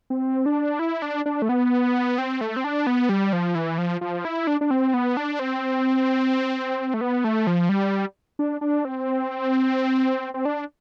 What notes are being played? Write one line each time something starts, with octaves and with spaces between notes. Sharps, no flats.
C4
D4
E4
D4
D4
A3
B3
C4
A3
C4
D4
B3
G3
F3
E3
F3
F3
E4
D4
D4
C4
B3
D4
C4
A3
B3
A3
F3
G3
D4
D4
C4
C4
D4